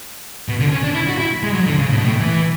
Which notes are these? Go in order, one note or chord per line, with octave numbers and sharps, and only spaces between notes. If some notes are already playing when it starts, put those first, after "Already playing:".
B2
D3
C#4
D4
E4
F#4
E4
G#3
F#3
D3
C#3
A2
B2
A2
E3